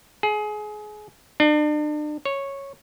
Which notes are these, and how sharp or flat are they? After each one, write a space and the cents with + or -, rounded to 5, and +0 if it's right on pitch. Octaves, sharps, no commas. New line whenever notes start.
G#4 +25
D4 +40
C#5 -5